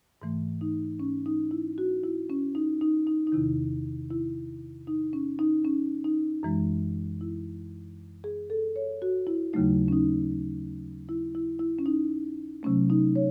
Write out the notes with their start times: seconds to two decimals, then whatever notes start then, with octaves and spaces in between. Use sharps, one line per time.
0.22 G#2 E3 A3
0.61 D#4
1.00 C#4
1.26 D#4
1.51 E4
1.78 F#4
2.04 E4
2.30 C#4
2.55 D#4
2.81 D#4
3.07 D#4
3.27 D#4
3.32 E2 C3 D#3 E4
4.11 E4
4.87 D#4
5.13 C#4
5.39 D#4
5.65 C#4
6.04 D#4
6.43 F#2 E3 G#3
7.21 E4
8.24 G#4
8.50 A4
8.76 C#5
9.02 F#4
9.27 E4
9.53 D#2 C#3 F#3 A3 D#4
9.88 C#4
9.93 D#4
11.09 E4
11.35 E4
11.59 E4
11.79 C#4
11.86 D#4
12.63 C3 F#3 A3 C#4
12.90 D#4
13.16 C#5